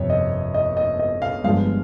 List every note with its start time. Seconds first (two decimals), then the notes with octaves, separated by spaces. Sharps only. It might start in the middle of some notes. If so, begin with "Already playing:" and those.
Already playing: G1 F2 C3 C#5
0.10 D#5
0.54 D#5
0.77 D#5
0.99 D#5
1.22 F5
1.44 G1 G2 F3 G#3 F5